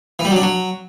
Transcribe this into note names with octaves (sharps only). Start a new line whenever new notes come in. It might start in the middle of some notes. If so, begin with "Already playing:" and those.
E3
G3
F#3
D4
F#3